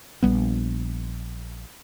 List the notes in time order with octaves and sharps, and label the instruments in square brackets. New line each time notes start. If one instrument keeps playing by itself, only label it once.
[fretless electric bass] A#1 G3 B3